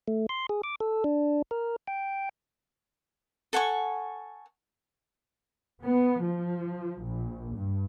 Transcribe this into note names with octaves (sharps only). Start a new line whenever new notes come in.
A3
C6
G#4
D6
A4
D4
A#4
G5
A4 F#5 G#5 C#6
B3
F3
A#1
G2